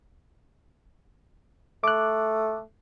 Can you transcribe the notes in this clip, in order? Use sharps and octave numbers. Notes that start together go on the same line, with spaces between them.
A3 D6 F#6